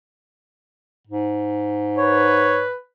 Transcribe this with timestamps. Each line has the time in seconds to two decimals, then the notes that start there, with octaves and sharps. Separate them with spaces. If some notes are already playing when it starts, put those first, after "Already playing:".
1.07 G#2
1.98 B4 C#5